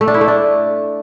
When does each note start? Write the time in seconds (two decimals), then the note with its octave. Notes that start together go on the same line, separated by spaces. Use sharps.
0.01 A3
0.08 D4
0.14 E4
0.21 A3
0.28 D4